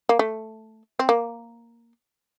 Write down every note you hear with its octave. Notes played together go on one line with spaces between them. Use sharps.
A#3
A3
C4
A#3